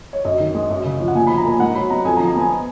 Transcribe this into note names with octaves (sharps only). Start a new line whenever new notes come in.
C#5
F#2 D#5
D#3
G#3
F#2
C#3
F3
F#5
A#2 G#5
F3 B5
A#5
A#3 G#5
G#2 F#5
F#3 B5
B3 A#5
F2 G#5
A#5
F3
A#5
B3 G#5